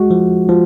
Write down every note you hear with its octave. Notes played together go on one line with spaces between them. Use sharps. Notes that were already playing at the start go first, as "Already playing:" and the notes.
Already playing: G#3 F#4
F3
F3